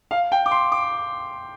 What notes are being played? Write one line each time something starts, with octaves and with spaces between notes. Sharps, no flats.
F5
G5
D6
C6
D6